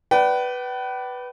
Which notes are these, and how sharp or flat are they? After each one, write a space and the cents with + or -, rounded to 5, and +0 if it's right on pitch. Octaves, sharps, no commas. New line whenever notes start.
B4 +0 D5 +0 G5 -45